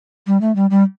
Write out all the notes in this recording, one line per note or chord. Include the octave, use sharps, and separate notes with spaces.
G3
A3
G3
G3